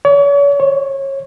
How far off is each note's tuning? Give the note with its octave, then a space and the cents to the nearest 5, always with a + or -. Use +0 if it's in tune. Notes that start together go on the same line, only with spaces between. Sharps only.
C#5 +40
C#5 -25